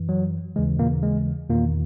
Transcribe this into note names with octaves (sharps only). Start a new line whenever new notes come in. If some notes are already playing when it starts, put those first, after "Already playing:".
Already playing: F#2 E3
F#3
D#2 C#3 E3 G#3
A#2 A#3
G#3
E2 A#2 D#3 A#3